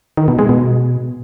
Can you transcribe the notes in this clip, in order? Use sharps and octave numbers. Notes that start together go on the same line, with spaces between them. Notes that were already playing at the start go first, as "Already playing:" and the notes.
D#3
B2
G#3
B2